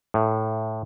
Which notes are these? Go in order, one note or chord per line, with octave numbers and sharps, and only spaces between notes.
A2